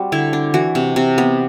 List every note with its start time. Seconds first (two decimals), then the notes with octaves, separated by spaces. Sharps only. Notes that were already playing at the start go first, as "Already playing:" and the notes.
Already playing: G3 C4 F#4
0.12 D3 E4
0.33 D4
0.54 E3 F#4
0.75 C3
0.96 C3
1.18 B3